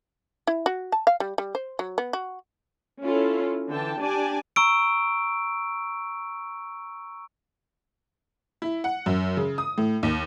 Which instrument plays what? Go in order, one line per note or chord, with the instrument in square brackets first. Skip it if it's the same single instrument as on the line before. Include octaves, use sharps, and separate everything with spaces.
[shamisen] E4
F#4
A5
F5
G3
G3
C5
F#3
B3
F#4
[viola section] C#4 E4 F4 A4
D3 E3 G5 A5
D4 G4 D5 G#5 A5
[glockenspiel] A#5 C#6 E6 D7
[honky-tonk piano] E4
F#5
F#2
C#3
D#6
A2
D#2